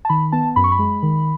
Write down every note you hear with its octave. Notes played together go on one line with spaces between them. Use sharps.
A5
D#3 B5
B3 A5
F#2 B5
C#6
B5
G#3
D#3